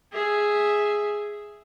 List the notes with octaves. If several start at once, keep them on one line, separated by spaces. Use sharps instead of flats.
G#4 E5